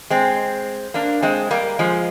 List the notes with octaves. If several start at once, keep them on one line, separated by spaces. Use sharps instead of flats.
G#3 C4
A#3 D4
G#3 C4
G3 A#3
F3 G#3